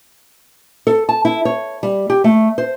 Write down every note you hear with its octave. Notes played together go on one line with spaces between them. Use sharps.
A4
A5
E4
C#5
G3
G4
A3
C5